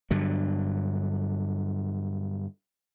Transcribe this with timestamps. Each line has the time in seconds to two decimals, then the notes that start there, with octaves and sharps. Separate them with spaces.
0.11 G2 D3 F#3